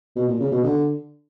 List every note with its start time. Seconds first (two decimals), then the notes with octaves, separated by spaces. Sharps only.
0.16 B2
0.28 A#2
0.40 C#3
0.52 B2
0.64 D3